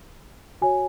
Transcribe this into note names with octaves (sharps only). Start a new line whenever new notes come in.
F#4 C#5 G#5